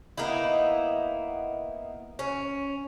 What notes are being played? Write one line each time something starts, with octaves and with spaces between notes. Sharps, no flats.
A#3 B3 D#4 E4
C#4